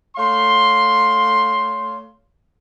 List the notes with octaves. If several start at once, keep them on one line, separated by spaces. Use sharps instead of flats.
A3 C#5 F5 C6